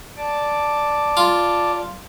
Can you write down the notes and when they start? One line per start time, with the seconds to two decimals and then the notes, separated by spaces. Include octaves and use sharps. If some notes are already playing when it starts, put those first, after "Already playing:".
0.17 D5 A5 D6
1.17 F4